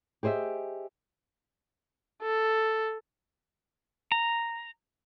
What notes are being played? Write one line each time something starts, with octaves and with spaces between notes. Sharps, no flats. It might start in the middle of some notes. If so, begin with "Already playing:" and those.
G4 G#4 C5 D#5 E5
A4
A#5